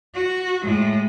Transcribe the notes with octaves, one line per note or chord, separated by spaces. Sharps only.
F#4
A2 G#3